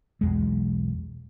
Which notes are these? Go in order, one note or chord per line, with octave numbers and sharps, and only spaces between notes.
B1 E2 G#3